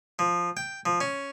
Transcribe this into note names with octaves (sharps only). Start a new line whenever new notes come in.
F3
G5
F3
C#4